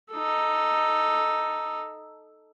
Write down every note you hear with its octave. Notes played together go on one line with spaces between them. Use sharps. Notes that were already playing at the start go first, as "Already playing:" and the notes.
D#4 A4